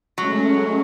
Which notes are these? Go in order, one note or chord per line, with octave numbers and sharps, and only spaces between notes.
F#3 G#3 A3 C#4